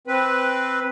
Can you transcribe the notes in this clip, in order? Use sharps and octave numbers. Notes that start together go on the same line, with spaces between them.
C4 B4